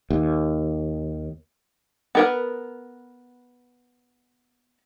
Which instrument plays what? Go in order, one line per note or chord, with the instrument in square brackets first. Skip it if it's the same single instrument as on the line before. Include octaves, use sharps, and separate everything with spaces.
[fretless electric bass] D#2
[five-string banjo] B3 A#4 B4